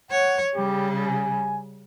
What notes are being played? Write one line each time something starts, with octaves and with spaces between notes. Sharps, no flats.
C#5 F#5
C#3 G3 G4
G#5